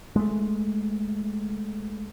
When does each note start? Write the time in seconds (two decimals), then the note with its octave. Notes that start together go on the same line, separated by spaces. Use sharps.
0.16 G#3 A3